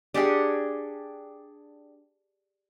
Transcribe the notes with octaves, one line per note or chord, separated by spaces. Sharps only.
D4 G4 G#4 F#5